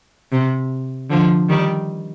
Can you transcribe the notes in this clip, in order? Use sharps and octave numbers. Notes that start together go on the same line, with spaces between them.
C3
D3 F3
D#3 G3